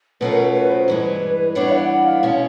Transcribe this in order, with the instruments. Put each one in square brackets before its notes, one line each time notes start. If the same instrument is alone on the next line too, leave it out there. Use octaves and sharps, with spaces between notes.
[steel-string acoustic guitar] B2 F#3 A3 C#4 F4 [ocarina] B4
[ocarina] A#4
B4
B4
C5
[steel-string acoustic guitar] G2 E3 G#3 [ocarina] B4
[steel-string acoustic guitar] E3 G3 B3 D4 [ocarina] C#5
[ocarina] F#5
F#5
F5
[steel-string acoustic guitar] B2 G#3 C#4 [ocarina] F5